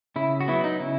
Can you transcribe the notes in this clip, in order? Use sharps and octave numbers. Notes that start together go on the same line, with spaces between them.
C#3 E4
F#4
F#3 B3 E4
D#4
C#3 E4